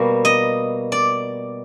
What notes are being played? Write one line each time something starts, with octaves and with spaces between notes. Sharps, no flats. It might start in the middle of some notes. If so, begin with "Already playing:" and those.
Already playing: B2 G3 A#3
D#5
D5